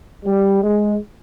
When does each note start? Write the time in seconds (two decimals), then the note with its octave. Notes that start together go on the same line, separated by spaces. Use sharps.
0.25 G3
0.62 G#3